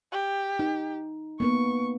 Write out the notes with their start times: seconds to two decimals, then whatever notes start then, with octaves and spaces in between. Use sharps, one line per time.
0.12 G4
0.59 D#4
1.40 A#3 B3 B4 C#6